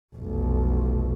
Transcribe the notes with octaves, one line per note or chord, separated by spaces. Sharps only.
F1 B1